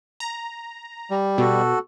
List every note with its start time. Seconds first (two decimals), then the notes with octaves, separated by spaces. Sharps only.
0.20 A#5
1.11 G3
1.38 B2 F#4 A4